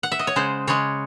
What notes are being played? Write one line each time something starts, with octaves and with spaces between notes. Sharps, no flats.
F#5
E5
D#5
C#5
C#3 G#3 C5
C#3 G#3 C#5